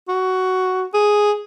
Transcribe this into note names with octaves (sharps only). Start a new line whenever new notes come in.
F#4
G#4